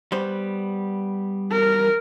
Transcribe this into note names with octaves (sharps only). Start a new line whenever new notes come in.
G3 B3 C5
A#4